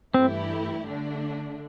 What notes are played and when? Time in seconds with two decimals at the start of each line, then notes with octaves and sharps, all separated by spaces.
0.14 G2 E3 A3 C4 E4 G4
0.87 D3 A3 D4